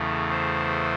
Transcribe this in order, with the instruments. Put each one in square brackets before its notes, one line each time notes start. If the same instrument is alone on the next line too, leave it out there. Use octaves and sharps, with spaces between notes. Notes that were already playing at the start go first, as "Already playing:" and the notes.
Already playing: [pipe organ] E2 C#3 E3 A3
C5